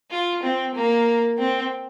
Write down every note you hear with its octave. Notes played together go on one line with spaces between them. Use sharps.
F4
C4
A#3
C4